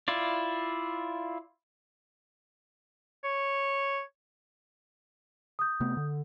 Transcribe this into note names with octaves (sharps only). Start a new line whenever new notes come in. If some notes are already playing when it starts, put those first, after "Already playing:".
E4 F4 D5
C#5
D#6 G6
C3 A3 B3
D3